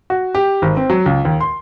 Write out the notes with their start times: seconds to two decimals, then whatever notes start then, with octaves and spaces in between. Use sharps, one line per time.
0.10 F#4
0.35 G4
0.62 G#1
0.77 C4
0.90 F#3
1.06 C#2
1.25 D#2
1.41 C6